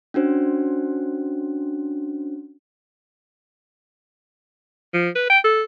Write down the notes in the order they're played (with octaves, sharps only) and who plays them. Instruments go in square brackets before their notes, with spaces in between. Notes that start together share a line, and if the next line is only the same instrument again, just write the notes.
[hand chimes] C#4 D4 F#4 C5
[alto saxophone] F3
B4
G5
A4